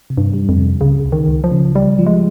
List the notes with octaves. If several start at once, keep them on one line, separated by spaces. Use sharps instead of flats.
C3
G2
G3
F2
C3
C#2 C#3
C#2
D#3
C#2
F3
C#3
G3 G4
F3
G#3